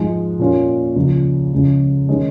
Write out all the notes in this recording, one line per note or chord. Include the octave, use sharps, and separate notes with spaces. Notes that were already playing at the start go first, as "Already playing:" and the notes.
Already playing: G#2 F3 G#3
A#2 A#3 C#4 F4
C#2 C#3 F3 C#4
C#2 C#3 F3 G#3
D#3 G#3 C#4